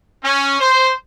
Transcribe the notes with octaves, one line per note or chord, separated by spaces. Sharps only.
C#4
C5